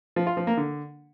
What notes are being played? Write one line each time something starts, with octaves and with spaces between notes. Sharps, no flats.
F3
F4
F3
A#3
D3